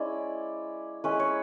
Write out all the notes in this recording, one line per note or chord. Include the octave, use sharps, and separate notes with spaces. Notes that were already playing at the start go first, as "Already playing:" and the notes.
Already playing: G#3 C#4 E4 D5
G#3 C#4 E4 B4
C#5